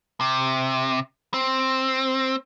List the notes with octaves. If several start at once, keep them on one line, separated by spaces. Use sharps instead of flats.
C3
C4